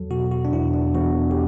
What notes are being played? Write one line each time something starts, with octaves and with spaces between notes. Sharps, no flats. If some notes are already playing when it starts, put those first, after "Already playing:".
Already playing: E2 F#3 A4
B2 F#4
F#4
D4
E2 E4
D4
E2 F#4
G4